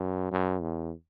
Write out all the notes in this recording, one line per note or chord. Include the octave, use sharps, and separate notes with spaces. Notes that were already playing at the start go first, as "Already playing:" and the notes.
Already playing: F#2
F#2
E2